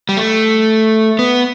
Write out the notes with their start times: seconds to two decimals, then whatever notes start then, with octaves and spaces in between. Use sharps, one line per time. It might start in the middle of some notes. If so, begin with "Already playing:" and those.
0.09 G3
0.17 A3
1.19 B3